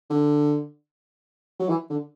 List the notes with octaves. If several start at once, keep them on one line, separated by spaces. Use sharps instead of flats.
D3
F#3
E3
D3